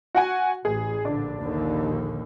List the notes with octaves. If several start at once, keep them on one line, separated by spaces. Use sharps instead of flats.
F#4 F#5 G#5
A1 G#4
A#1 D3 D4
A#1 D#2 D3